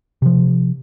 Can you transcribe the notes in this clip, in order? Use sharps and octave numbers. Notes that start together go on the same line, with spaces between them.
C3 F3